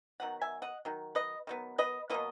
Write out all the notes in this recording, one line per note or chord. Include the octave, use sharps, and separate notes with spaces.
D#3 F#3 B3 F#5
E5 G#5
D#5 F#5
D#3 F#3
B4 D#5
D#3 F#3 B3
B4 D#5
B2 F#3 A#3 B4 D#5